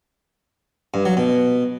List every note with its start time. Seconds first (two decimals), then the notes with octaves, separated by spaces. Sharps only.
0.94 G2
1.05 F#3
1.17 B2